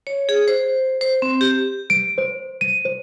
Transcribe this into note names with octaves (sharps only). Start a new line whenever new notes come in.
C#5
G#4
C5
C5
C4
G4
D7
C5
D#7
C5